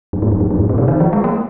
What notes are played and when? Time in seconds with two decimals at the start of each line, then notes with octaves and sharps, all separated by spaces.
0.13 F#2
0.22 G#2
0.32 F#2
0.40 F2
0.51 F#2
0.59 G#2
0.69 A#2
0.78 C3
0.88 D#3
1.00 F3
1.13 G#3
1.24 A#3